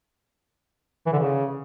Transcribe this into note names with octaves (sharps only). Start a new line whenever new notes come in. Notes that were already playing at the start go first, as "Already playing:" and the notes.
E3
D3
C#3